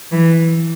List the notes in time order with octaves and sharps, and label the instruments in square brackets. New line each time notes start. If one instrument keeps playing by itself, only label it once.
[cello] E3